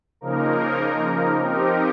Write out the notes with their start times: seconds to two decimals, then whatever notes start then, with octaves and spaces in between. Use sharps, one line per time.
0.21 C#3 F3 A#3 D#4 A#4
1.40 F3 C4 D#4 G4 A#4